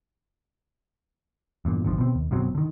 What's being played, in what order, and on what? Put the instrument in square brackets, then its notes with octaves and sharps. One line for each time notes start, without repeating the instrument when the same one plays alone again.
[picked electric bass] E2 G2 A#2
G#1 D3 F3
B2 C4
D#2
F#1 B2 F#3 C4
D3 D#3